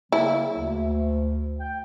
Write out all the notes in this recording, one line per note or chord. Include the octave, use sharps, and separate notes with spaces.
C#3 F#3 A#3 E4
D2
G5